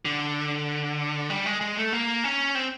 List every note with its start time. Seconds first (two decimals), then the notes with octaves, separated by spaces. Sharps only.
0.05 D3
1.30 G3
1.46 G#3
1.61 G#3
1.77 A3
1.93 A#3
2.24 C#4
2.55 C4